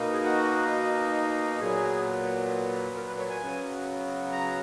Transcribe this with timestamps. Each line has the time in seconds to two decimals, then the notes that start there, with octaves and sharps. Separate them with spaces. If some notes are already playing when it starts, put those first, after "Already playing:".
Already playing: B2 A#3 D#4
0.13 G#4
0.24 F#4
1.60 A#2 F#3 B3 G#4
2.96 A#4
3.07 B4
3.19 C#5
3.30 G#5
3.41 C#3 F#3 B3
4.32 A#5